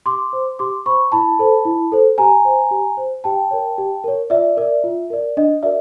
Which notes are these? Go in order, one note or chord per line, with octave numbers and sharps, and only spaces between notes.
G4 C6 D6
C5
G4 C6 D6
C5 B5 C#6
E4 A5 B5
A4 C5
E4
A4 C5
G4 G#5 A#5
C5
G4
C5
G4 G5 A5
A#4 C#5
G4
A#4 C#5
F4 D5 E5
A#4 D5
F4
A#4 D5
D4 D#5
F#4 A#4 D5 E5